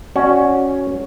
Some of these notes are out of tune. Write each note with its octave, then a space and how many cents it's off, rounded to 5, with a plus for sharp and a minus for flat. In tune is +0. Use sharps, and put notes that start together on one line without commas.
C#4 +0 F#4 +0 D5 +0